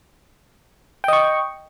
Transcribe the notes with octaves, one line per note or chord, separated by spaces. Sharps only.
D#5 G5 C#6